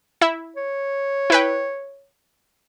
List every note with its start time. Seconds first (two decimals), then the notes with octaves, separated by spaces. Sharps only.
0.21 E4 E5
0.56 C#5
1.30 E4 B4 G5